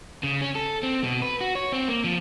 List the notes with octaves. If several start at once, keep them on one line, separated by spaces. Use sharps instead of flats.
C#3
C#4
A4
C4
B2
B4
F#4
C#5
C4
A#3
F3